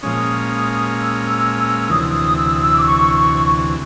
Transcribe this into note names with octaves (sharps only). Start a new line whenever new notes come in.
A#2 F3 G#3 C#4 D#6
E6
E6
E6
D2 C3 E3 D#6
D#6
E6
E6
D6
C#6
C#6